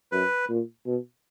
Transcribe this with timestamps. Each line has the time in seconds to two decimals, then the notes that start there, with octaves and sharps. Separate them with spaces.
0.12 F#2 B4
0.49 A#2
0.86 B2